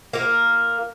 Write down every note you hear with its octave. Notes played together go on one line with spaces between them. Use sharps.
A#3 F4 A#4